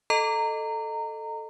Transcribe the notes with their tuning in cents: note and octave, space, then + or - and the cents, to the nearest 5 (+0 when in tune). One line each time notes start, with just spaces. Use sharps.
A4 +0 D#5 -15 A#5 -20